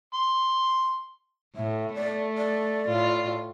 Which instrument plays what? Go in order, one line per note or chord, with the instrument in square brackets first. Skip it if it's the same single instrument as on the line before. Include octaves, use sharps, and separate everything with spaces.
[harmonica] C6
[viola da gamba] A2 [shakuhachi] E5
[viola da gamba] A3 [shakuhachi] D5
[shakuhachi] D5
[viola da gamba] A2 F4